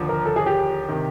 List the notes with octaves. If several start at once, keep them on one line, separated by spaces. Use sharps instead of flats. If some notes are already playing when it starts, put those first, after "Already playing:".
Already playing: D#2 D3 F3
A#4
A4
G#4
G4
C3 D#3